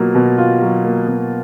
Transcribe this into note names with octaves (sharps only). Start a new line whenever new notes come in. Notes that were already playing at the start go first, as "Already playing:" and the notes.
Already playing: B2 F#3 A#3 F4
B2
F4
F#3
A#3
B2